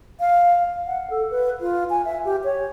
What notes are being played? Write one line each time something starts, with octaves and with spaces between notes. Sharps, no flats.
F5
F#5
A4
B4
F4
G#5
E5
G4
C#5